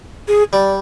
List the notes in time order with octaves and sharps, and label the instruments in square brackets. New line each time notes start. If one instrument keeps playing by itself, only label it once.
[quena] G#4
[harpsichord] G3 [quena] D5